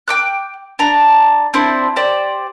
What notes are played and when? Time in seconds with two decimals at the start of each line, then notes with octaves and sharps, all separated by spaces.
0.08 G5 D6 F#6
0.79 D4 A#5
1.54 C4 D4 E4 C5
1.96 G4 C5 D5